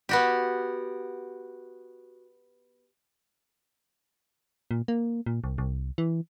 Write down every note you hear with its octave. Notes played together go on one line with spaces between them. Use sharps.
B3 F#4 G4
A#2
A#3
A#2
C2
C2
E3